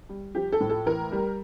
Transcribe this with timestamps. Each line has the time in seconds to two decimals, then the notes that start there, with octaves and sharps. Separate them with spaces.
0.09 G3
0.35 F3 G4
0.52 A4
0.60 A2
0.69 A4
0.86 E3 A#4
1.12 G3